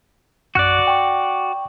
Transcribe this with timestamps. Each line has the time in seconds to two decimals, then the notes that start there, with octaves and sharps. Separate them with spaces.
0.55 A#1 F#2 F#4 D5 F#6
0.88 G5 C#6